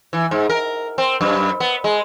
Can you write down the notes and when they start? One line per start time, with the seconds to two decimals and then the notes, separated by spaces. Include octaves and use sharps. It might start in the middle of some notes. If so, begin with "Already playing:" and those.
0.13 E3
0.31 G#2
0.50 A#4
0.98 C4
1.21 F#2
1.60 B3
1.84 G#3